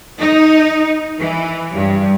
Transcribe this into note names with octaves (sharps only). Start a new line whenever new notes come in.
D#4
E3
G2